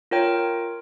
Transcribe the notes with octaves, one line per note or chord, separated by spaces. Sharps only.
F4 A#4 C#5 G5